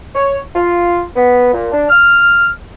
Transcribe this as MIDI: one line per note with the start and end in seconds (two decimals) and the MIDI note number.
0.15 0.39 73
0.55 1.03 65
1.16 1.53 59
1.53 1.71 46
1.72 1.86 62
1.89 2.49 89